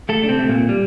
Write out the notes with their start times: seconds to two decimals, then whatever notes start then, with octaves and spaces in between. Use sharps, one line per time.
0.09 A3 A4
0.23 D4
0.29 C3 C4
0.39 A3
0.49 A#2 A#3
0.69 G3